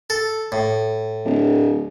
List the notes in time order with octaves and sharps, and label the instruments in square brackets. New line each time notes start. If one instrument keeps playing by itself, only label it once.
[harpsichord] A4
A2
[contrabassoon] D1